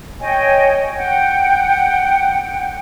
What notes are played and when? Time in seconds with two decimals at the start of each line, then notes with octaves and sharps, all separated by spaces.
0.21 C#5 D#5 G5 G#5
0.95 F#5 G5